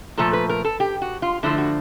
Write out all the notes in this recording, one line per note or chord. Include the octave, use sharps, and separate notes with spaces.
A#2 F3 A3 A4
B4
A#4
A4
G4
F#4
F4
D3 F3 A3 E4
F#4